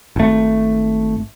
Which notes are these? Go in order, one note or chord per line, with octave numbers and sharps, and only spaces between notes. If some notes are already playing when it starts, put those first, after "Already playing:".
G#1 A3